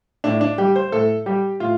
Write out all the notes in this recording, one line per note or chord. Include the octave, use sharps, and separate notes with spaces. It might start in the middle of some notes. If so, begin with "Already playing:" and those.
A2 D4
D4
G3 G4
C5
A2 A4
G3 G4
A2 F4